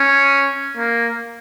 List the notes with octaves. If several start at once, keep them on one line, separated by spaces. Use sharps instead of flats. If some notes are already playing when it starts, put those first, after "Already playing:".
Already playing: C#4
A#3